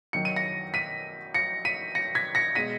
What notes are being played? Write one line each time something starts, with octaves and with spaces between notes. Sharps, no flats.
F#2 D#3 F#3 C#7
D#7
A#6 C#7
B6 D#7
A#6 C#7
B6 D#7
A#6 C#7
G#6 B6
A#6 C#7
B2 G#3 B6 D#7